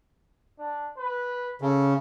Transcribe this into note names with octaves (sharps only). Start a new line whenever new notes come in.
D4
B4
C#3 A4